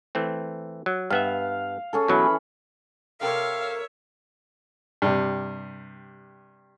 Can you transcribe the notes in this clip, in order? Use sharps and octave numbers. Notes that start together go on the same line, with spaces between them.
E3 A3 C4
F#3
G2 B3 E5 F5
C#4 G#4 A4
B2 E3 F#3 C#4 B5
C3 A4 A#4 C#5 E5 F5 G5
G2 C3